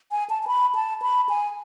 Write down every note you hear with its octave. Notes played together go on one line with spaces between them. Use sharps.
G#5
A5
A5
B5
A5
B5
G#5